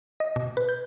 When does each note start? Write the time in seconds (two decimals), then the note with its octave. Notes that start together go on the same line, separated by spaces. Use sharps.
0.20 D#5
0.36 B2
0.57 B4
0.69 G6